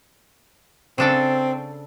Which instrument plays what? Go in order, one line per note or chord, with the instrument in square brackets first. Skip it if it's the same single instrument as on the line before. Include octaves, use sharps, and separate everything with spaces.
[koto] C#3 D4 A4 [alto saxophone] C4